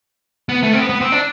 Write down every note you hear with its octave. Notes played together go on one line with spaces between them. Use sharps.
B3
A3
C4
B3
B3
C4
D4